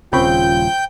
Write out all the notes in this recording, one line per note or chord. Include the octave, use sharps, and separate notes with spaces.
D#1 C#3 C4 F4 G5 B5 C#6 G6